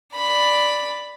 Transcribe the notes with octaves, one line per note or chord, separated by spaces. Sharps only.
D5 B5